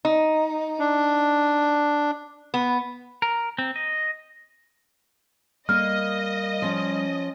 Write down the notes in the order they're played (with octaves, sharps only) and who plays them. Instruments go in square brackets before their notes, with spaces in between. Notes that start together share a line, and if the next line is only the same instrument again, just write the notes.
[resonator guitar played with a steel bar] D#4
[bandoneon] D4
[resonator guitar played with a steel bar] B3
[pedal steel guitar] A#4
C4
D#5
[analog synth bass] G3 [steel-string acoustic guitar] A#3 [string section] D#5 [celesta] F6
[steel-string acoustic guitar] F3 C#4